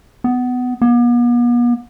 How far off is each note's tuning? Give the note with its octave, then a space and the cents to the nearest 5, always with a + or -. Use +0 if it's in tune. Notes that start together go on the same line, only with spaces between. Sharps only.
B3 +15
B3 -45